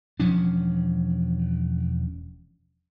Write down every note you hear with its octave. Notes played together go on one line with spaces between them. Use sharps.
E1 F3 C#4 D4